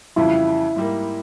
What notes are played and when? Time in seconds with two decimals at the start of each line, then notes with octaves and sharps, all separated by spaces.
0.16 F2 C#3 E3 G3 E4
0.76 G#2 G3 A#3